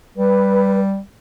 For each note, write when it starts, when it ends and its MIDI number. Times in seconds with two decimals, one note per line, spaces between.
0.18 0.99 55
0.18 0.79 71